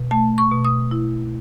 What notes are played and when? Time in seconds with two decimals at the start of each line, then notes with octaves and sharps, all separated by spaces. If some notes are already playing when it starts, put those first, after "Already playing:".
Already playing: B2
0.11 A3 A5
0.38 C#6
0.51 B2
0.65 D#6
0.91 E4